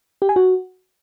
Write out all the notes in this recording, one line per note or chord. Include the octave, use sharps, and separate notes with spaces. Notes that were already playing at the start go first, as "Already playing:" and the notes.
G4
G#5
F#4